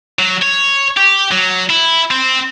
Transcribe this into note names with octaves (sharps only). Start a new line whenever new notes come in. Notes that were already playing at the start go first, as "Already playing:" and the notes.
F#3
C#5
G4
F#3
E4
C4